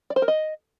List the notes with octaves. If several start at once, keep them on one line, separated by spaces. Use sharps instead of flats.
D5
C5
A#4
D#5